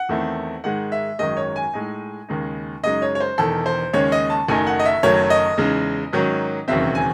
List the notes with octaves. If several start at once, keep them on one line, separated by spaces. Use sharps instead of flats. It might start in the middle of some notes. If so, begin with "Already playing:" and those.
Already playing: F#5
E2 D#3 A3 C4 E4
G#2 D#3 G#3 F#5
E5
G#1 F#2 D#3 G#3 D#5
C#5
G#5
A2 G#3 D#4
D#2 C#3 G#3 D#4
F#2 C#3 G#3 D#4 D#5
C#5
C#5
C5
E1 E2 D#3 A4
C5
D#2 C#3 G#3 C#4 C#5
D#5
A5
F#1 F#2 D#3 A3 D#4 G#5
F#5
D#5
E5
F#1 F#2 D#3 F#3 A3 C#5
D#5
E2 C#3 G#3 D#4
G#2 D#3 F#3 C#4
E1 D#2 C#3 F#3 C4 E5
G#5